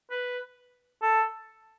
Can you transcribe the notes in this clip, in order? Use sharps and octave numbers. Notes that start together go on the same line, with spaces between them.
B4
A4